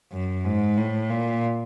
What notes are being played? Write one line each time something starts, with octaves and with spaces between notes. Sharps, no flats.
F#2
G#2
A2
A#2